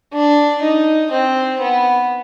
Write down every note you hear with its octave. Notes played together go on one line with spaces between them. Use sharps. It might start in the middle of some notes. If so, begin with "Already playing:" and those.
D4
D#4
C4
B3